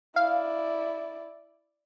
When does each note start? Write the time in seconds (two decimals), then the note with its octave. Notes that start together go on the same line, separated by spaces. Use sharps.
0.16 E4 D5 F5